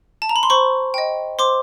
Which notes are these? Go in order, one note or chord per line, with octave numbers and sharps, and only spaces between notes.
A5
A#5
B5
C6
C5 B5 C#6
D#5 G5
C5 C6 D6